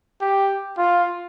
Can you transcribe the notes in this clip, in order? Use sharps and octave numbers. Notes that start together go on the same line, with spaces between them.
G4
F4